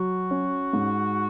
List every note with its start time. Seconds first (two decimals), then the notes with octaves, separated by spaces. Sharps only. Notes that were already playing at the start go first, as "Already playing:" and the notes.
Already playing: F#3 F#4
0.31 C#4
0.73 G#2